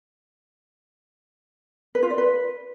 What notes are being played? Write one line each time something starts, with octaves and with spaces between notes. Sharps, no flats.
B4
F4
D5
B4